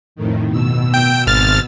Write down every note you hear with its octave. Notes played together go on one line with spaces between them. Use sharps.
F2 A2 D#3
B2 E6
G5
G#1 F6 A6